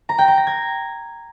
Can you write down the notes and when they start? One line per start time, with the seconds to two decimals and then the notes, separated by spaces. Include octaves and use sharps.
0.09 A#5
0.18 G5
0.28 A#5
0.37 A#6
0.47 G#6